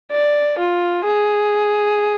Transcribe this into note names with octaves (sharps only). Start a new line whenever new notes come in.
D5
F4
G#4